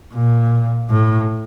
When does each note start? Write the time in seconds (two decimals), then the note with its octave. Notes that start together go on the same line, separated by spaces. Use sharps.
0.14 A#2
0.89 A2